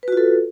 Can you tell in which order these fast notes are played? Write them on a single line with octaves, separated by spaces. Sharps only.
B4 F#4 F4 A4